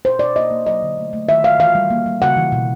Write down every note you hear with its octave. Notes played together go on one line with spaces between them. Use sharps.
B2 C5
B2 D5
A#3 D#5
A#3
F#3 D#5
D3
A3
A3
D#3 E5
D#3 F5
E3 F5
G3
A#3
G3
C#3 F#5
E3
B2